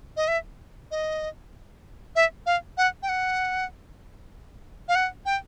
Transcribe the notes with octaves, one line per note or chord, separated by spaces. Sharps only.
D#5
E5
D#5
E5
F5
F#5
G5
F#5
F5
F#5
G5